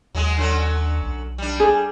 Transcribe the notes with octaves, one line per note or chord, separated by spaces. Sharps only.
D#2 F#3 G#3 G#4
D3 F#3 C#4
B1
G3 D4
G#4